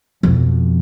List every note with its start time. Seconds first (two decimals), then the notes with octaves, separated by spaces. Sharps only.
0.23 F2 B2